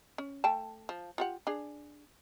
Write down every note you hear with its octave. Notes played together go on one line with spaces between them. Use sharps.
C#4
A3 G5 A5
F3
F4 G4 F#5
D4 G#4